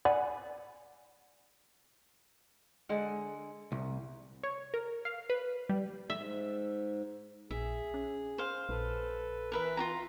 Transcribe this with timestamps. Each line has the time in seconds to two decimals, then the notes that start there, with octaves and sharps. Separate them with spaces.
0.05 D5 F#5 G#5 B5
2.89 D3 G#3 F#5
3.72 C2
4.43 C#5
4.74 A#4
5.05 F5
5.30 B4
5.69 G3
6.10 G#2 E5
7.51 A#1 G#4 E5
7.94 C#4
8.38 C5 F5
8.69 A#1 A4 B4
9.52 E3 A#4 B4 E5
9.77 F4 F#4 A#5